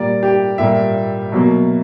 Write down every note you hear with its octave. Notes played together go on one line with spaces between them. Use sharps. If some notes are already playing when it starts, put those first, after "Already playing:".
Already playing: A#2 G3 A#3 D5
G4
A#2 G3 A#3 E5
B2 F#3 A#3